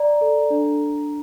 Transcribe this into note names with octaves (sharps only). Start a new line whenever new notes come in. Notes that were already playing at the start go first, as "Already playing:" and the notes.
Already playing: D5 A#5
A4
D4